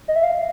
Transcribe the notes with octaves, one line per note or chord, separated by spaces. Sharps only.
D#5
E5
F5